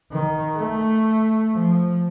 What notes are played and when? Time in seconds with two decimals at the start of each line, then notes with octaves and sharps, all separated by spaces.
0.12 D#3
0.56 A3
1.55 F3